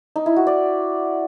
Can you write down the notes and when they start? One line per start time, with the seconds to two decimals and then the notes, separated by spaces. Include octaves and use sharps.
0.16 D#4
0.26 E4
0.36 F#4
0.47 D5